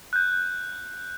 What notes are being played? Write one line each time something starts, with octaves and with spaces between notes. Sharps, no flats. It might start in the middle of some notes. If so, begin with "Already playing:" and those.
F#6 G6